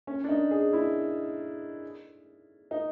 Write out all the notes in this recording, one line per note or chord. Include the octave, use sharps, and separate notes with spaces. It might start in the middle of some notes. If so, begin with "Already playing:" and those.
C#4
D4
D#4
G#4
E4
D#4